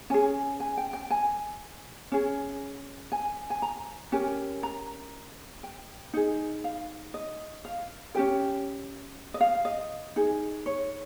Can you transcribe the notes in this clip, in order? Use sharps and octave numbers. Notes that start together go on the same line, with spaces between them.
C#4 G#4 G#5
G#5
G5
G5
G#5
C#4 G#4
G#5
G#5
A#5
C#4 G4 A#4 G#5
A#5
G5
D#4 G#4
F5
D#5
F5
C#4 G4 A#4 G5
D#5
F5
D#5
D#4 G#4
C#5